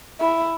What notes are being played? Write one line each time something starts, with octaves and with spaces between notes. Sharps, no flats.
E4